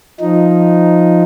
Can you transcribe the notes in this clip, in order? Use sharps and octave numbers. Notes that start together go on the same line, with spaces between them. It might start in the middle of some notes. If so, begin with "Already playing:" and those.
F3 D#4